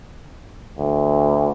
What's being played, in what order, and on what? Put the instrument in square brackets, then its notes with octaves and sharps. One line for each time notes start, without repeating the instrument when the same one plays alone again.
[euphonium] D2